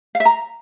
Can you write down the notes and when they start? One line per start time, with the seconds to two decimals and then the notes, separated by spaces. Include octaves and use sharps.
0.15 F5
0.20 E5
0.25 A#5